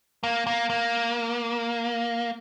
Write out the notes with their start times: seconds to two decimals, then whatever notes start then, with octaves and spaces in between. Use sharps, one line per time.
0.23 A#3
0.47 A#3
0.70 A#3